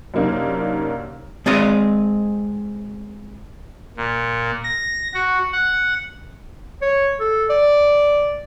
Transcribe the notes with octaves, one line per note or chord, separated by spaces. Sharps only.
F#2 C3 A#3 D4 D#4
G#3 C4 D5 D#5
A#2
A#6
F#4
F#5
C#5
A4
D5